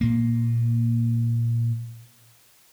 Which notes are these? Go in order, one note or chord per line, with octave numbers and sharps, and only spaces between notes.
A#2 A#3